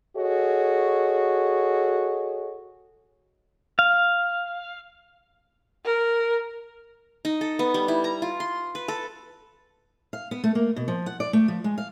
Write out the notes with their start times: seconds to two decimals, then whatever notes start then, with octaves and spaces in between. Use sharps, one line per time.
0.16 F#4 G#4 A4 C#5 D#5
3.79 F5
5.84 A#4
7.25 D#4
7.41 A4
7.59 B3
7.74 G3
7.88 E4
8.04 A#5
8.22 F4
8.40 C6
8.75 B4
8.88 A4
10.13 F5
10.31 B3
10.44 A3
10.55 A#3
10.76 B2
10.88 F3
11.06 F#5
11.20 D5
11.33 A3
11.48 F3
11.64 G#3
11.78 F5